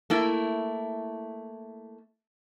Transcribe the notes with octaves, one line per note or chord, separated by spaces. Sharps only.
A3 A#3 E4